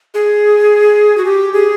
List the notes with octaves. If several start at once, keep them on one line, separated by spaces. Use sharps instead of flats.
G#4
F#4
G4
G#4